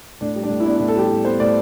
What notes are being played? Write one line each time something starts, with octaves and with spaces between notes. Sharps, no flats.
A2 D4
G3
D4
A2
E4
B3 D4
D4
A2
A4
G3 G4
A2
B3 C5
A2 D5